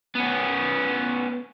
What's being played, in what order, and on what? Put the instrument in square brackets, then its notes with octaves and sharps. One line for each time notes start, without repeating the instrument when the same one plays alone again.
[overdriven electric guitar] B3 C#4